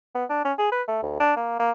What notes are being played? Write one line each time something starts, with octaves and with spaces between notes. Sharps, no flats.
B3
D4
C#4
G#4
B4
A3
D2
D4
A#3
A#3